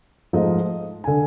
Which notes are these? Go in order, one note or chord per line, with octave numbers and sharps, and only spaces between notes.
G#2 F3 A3 D#5
D3 G#5